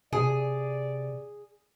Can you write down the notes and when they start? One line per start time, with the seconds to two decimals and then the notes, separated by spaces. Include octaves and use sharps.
0.13 C3 G#4 D5